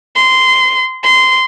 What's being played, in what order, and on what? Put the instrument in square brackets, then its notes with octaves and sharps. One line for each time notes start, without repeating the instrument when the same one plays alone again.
[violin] C6
C6